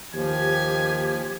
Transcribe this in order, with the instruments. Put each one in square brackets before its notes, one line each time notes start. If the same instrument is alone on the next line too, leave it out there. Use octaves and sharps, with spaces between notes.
[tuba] D#2 [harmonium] F3 [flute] G4 [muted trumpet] G#5